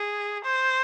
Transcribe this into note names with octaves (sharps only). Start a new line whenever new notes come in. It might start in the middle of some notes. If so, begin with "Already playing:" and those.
Already playing: G#4
C5